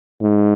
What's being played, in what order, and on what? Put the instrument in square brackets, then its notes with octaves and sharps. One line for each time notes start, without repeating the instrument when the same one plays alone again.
[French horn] G#2